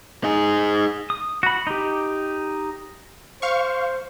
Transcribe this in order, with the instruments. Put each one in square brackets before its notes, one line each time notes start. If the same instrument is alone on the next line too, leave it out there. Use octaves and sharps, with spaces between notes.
[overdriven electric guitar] D#4 G#4
[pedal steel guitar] D#6
F#4 B5
D#4 G4
[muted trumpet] C5 [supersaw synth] F5 C#6